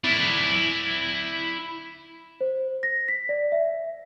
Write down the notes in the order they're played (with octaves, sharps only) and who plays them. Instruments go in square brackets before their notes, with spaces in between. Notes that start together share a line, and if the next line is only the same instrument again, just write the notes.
[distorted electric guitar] E4 D5
[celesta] C5
A#6
B6
D5
E5